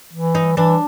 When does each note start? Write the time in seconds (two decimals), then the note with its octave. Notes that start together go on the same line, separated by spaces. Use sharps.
0.14 E3
0.35 D#4
0.57 E3 D4